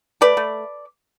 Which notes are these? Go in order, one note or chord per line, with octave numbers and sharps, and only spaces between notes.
A3 B4 D5
A3